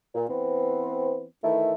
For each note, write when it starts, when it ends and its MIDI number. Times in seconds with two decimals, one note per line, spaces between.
0.15 0.28 46
0.29 1.24 52
0.29 1.24 59
0.29 1.24 60
1.44 1.74 51
1.44 1.74 52
1.44 1.74 57
1.44 1.74 64
1.44 1.74 69